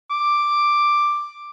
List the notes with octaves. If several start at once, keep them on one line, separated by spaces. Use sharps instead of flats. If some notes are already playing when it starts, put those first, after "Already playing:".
D6